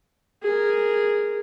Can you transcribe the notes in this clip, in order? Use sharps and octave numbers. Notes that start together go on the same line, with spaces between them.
G#4 A#4